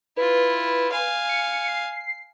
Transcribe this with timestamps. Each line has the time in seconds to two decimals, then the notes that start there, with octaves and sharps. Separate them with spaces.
0.17 E4 F4 B4
0.92 F5 G#5
1.29 C#7
1.68 C7